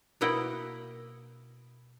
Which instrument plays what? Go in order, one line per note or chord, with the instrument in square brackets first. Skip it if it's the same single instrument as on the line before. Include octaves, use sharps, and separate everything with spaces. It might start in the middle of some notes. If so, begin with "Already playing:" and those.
[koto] B2 A#3 E4 D#5 F#5 G5